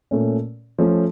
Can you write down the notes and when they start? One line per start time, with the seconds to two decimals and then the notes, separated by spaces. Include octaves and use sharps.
0.11 A#2 A3 C#4
0.78 F3 A3 C#4